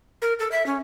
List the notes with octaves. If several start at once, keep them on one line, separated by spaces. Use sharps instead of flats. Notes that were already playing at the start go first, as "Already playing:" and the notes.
A#4
A4
E5
C#4